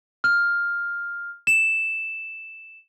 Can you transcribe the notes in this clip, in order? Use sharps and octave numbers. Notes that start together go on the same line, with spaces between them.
F6
E7